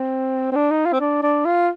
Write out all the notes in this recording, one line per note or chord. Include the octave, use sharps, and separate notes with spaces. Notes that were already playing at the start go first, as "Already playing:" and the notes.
Already playing: C4
C4
D4
D#4
F4
C4
D4
D4
F4